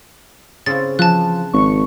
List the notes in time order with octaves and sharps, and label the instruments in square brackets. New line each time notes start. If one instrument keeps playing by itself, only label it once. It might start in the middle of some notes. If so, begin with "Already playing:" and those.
[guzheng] C#3 C4 E4 [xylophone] A6
[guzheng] E3 [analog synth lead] F3 [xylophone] A5 F#6
[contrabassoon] G#1 [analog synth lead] C#6